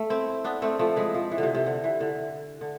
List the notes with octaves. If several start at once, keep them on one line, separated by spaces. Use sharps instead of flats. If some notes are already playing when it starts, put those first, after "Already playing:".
Already playing: A3
C4 E4
B3 D4
A3 C4
F3 A3
E3 G#3
F3
E3
D3
C3
C3
D3
E3
D3
D3